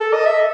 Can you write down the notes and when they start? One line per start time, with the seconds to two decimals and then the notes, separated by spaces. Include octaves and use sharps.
0.01 A4
0.13 D#5
0.26 E5